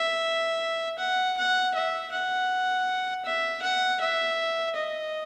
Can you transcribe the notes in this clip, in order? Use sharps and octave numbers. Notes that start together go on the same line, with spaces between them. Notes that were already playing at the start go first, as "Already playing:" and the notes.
Already playing: E5
F#5
F#5
E5
F#5
E5
F#5
E5
D#5